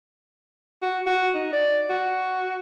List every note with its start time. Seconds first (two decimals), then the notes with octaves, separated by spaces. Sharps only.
0.82 F#4
1.06 F#4
1.35 D#4
1.53 D5
1.90 F#4